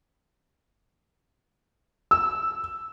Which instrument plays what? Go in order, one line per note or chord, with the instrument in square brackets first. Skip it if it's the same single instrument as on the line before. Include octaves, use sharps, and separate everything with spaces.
[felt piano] E6